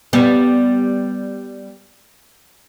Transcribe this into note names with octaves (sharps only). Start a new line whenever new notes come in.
G3 B3